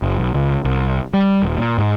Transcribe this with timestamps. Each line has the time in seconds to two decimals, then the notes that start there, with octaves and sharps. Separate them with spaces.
0.02 F#1
0.18 B1
0.34 C#2
0.65 C2
1.13 G3
1.42 D#1
1.57 A#2
1.78 G#2